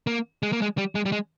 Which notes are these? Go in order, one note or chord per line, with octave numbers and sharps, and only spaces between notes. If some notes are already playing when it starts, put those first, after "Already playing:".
A#3
G#3
A#3
G#3
G3
G#3
G3
G#3